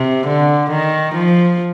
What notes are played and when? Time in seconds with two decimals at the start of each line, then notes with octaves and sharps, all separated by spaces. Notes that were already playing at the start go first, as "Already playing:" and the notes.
Already playing: C3
0.27 D3
0.70 D#3
1.15 F3